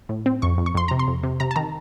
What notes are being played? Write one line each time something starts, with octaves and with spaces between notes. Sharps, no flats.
A2
C4
F2 C#6
F2
C#6
F2 C6
C3 A#5
C6
F2
C3
C3 A#5
A5
D#3 A#5